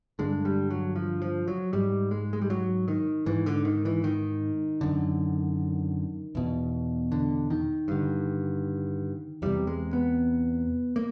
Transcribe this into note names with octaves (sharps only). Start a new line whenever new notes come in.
G2 D3 G#3
G3
F#3
F3
F3
F#3
G#2 G3
G#3
G#3
G3
F#3
D#3
G#2 E3
D3
D#3
E3
D#3
F#2 D3
E2 B2
D3
D#3
G2 D3
E2 C3 G3
G#3
B3
A#3